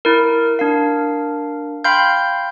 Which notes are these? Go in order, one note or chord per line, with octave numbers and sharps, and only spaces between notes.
E4 A#4
D4 A#4 F5
F5 G5 B5 C6 F6 G6